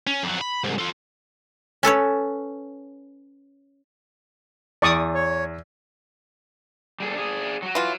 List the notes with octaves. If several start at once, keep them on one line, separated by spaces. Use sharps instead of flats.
C#4
F2 F#3
B5
C2 G#2
F4 A4
C#4 A4 B4 C#5
E2 D5 C#6 D#6
C#5
G3 G#4 A4
D4 G#4
F#3 F#4
E3 F4